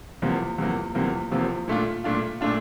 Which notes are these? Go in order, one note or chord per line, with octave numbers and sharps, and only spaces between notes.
E2 C3 F3 A#3
E2 C3 F3 A#3
E2 C3 F3 A#3
E2 C3 F3 A#3
A#2 A3 D4 F4
A#2 A3 D4 F4
A#2 A3 D4 F4